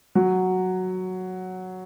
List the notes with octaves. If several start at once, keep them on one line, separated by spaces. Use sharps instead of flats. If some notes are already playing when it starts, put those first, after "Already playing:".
F#3